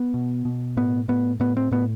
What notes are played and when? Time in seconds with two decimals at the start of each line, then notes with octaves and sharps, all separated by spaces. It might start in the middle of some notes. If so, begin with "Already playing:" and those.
Already playing: B3
0.14 B2
0.45 B2
0.77 A2 B3
1.08 A2 B3
1.40 A2 B3
1.57 C4
1.71 A2 B3